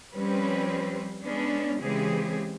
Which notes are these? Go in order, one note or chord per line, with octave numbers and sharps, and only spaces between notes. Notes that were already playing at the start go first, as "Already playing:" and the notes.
F3 G3 C4 C#4 B4
G#3 B3 C#4 D4
C#3 E3 G#3 C4 G4 G#4